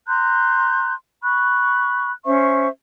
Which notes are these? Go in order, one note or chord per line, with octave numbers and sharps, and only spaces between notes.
A#5 C6 F#6 G6
B5 C#6 F#6
C#4 C5 E5 C#6